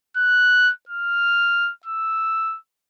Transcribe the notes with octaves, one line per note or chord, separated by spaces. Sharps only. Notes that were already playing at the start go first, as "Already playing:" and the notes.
F#6
F6
E6